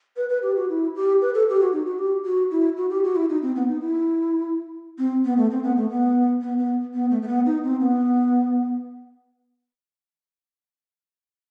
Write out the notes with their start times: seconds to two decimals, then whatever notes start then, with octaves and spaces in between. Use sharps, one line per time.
0.17 B4
0.29 B4
0.43 G4
0.56 F#4
0.69 E4
0.95 G4
1.21 B4
1.34 A4
1.49 G4
1.60 F#4
1.73 D#4
1.86 F#4
1.99 G4
2.25 F#4
2.51 E4
2.77 F#4
2.90 G4
3.04 F#4
3.16 E4
3.29 D#4
3.43 C4
3.56 B3
3.68 D#4
3.81 E4
4.98 C4
5.25 B3
5.37 A3
5.51 C4
5.63 B3
5.77 A3
5.90 B3
6.41 B3
6.58 B3
6.94 B3
7.11 A3
7.22 A3
7.28 B3
7.46 D#4
7.64 C4
7.80 B3